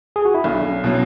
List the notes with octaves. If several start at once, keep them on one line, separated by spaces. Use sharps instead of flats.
G#4
F#4
E4
B1 D4
C#4
B2 F#3 E4